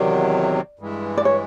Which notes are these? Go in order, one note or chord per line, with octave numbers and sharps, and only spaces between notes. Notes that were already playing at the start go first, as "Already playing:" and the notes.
Already playing: E2 C3 D#3 F#3 D5
G2 E3 G#3
D5
C#5